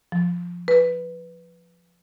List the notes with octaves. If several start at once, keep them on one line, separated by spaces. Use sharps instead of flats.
F3
B4